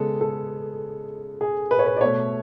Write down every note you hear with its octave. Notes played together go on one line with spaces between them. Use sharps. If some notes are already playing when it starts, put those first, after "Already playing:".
Already playing: C#3 G#3 B3 A4
A4
G#4
B4
C#5
B4
D5
B2 A3 C#5